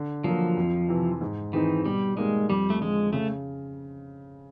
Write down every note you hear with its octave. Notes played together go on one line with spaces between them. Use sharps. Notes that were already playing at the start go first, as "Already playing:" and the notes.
Already playing: D3
F3 F#3 A#3
F2
C3 E3
G#2
D#3 E3 G#3 C4 D#4
B2 G3
G3 G#3 A#3 D#4
F2 G3
A3
D3 F3 G#3
C#3 A3